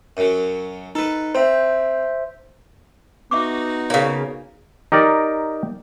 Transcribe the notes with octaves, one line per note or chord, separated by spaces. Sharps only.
F#2 F#3
D#4 A4 B4
C4 C5 E5
B3 D#4 F#4 E5 C#6 D6
C#3 A#3 C#5 F5
D#4 G4 A#4 D5